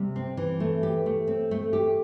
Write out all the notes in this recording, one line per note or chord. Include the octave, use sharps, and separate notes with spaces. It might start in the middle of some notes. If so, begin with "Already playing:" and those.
Already playing: C3 G3
C4
E3
A3
G4
A3
C4
A3
G4